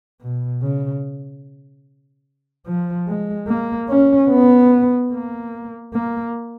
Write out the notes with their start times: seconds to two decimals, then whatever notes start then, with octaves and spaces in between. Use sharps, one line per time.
0.21 B2
0.62 C#3
2.67 F3
3.07 G#3
3.48 A#3
3.89 C#4
4.30 B3
5.11 A#3
5.93 A#3